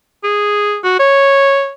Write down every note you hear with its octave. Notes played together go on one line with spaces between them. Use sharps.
G#4
F#4
C#5